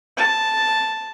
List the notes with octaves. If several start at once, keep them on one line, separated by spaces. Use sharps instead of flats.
A5